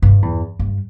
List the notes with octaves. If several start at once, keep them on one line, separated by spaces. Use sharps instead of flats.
G2
E2
G2